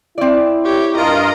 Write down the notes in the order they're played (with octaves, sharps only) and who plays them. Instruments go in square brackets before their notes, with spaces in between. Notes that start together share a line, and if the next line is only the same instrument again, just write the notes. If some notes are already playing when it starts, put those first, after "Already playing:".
[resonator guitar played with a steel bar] C4 D5 [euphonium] E4
[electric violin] G4 C#5
[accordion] G2 F4 A#4 [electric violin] D#5 A#5